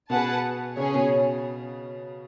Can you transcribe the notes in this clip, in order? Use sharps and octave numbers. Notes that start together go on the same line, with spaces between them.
B2 G#4 B4 F#5 A5
C#3 C#4 G#4 C#5
B2